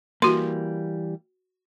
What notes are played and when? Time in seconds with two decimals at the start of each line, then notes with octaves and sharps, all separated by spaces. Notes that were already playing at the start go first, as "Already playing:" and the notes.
0.22 E3 G3 A#3 F#4 C6